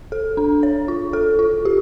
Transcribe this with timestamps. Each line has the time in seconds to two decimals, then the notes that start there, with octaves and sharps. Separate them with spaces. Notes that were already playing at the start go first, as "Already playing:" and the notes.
0.12 A4
0.37 D4
0.63 C#5
0.88 F4
1.13 A4
1.39 F4
1.65 G4